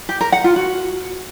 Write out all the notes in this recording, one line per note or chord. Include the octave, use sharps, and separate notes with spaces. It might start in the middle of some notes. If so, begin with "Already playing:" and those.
G4
A#4
F#5
F4
F#4